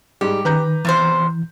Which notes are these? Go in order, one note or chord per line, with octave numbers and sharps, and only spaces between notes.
G#2 G3 G4
D#3 B4 A#5 G6
E2 C3 E3 C5